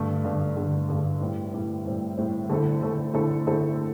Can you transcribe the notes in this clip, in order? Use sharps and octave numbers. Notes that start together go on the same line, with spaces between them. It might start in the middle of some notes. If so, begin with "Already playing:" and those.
Already playing: G2 D3 A3
G2 D3 A3
G2 D3 A3
G2 D3 A3
A2 G3 C4
A2 G3 C4
A2 G3 C4
A2 G3 C4
D3 A3 C4 E4 A4
D3 A3 C4 E4 A4
D3 A3 C4 E4 A4
D3 A3 C4 E4 A4